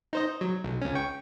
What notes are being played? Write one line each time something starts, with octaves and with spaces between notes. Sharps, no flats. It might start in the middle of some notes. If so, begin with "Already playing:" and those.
D#4 C5 D#5
F#3
B1
C#2 C#4
G5 C#6